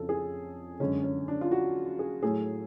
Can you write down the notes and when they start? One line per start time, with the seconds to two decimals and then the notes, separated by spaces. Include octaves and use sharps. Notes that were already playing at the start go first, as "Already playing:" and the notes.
Already playing: F2 C#3 F3 A4
0.09 G#4
0.80 F#2 D3 G#3 C#4
1.04 C#4
1.28 D4
1.41 F4
1.51 F#4
1.99 G#4
2.23 A2 F#3 A3 G#4